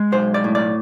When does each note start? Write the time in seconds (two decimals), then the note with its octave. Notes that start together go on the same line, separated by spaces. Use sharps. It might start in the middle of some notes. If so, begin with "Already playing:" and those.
Already playing: G#3
0.12 B1 C5
0.34 D5
0.44 A2
0.55 D5